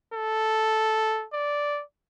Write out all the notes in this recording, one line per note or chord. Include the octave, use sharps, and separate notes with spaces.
A4
D5